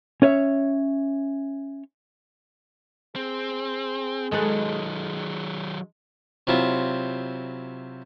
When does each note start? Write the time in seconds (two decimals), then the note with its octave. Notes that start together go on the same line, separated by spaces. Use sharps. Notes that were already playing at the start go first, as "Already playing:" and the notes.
0.22 C#4 C#5 E5
3.16 C4 G#4
4.32 D#3 F#3 G#3 A4 B4
6.47 C3 F#3 C4 E4 F4